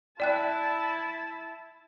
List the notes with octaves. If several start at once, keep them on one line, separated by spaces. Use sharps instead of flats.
E4 D5 G5 A5 F#6